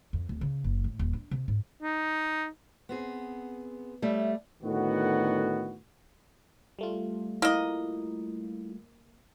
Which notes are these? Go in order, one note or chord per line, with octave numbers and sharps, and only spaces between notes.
F2
D1
C#3
F#1
A2
D#1
D4
C3
G#2
D#4
B3 C4 G#4
G3 A3 C#5 E5
A2 D3 D#3 B3 F#4
G3 A3 F4
A#3 E4 D#5